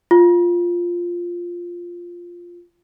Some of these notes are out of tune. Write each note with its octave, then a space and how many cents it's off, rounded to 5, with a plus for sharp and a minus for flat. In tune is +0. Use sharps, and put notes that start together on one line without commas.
F4 +0